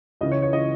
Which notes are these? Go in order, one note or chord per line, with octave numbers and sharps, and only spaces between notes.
C#2 C#3 E3 D#5
C#5
C#5
C#3 E3 D#5